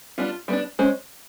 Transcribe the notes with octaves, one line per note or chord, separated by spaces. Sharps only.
G3 B3 D4 F4
G3 B3 D4
G#3 C#4 C5